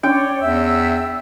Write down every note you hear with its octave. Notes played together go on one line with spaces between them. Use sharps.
C#4 D4 C#5 D5 G5
E2 E5 E6